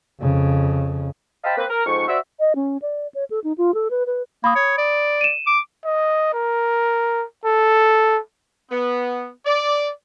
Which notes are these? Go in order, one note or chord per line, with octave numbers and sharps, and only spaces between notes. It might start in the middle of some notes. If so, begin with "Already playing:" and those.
F2 C#3
C5 D#5 F5 G5 A5 B5
A#3 C4 B4
A#4
F2 G#2 C#6
F#4 C5 D5 E5
D#5
C#4
D5
C#5
A4
D#4
F4
A4
B4
B4
A#3 B5 D#6
C#5
D5
D#7 E7
D6
D#5
A#4
A4
B3
D5